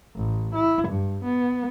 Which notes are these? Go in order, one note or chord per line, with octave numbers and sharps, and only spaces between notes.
A1
E4
G2
B3